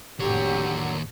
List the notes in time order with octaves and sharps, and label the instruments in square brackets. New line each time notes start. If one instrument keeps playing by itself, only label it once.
[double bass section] F1 A2 [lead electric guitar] D#2 C#5 [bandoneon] D3 F#3 [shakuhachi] G4